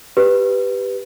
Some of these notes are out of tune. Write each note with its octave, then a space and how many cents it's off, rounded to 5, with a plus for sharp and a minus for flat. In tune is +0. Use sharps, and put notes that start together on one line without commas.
G4 +0 B4 +0